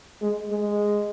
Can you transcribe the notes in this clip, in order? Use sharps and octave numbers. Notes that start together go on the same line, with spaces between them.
G#3
G#3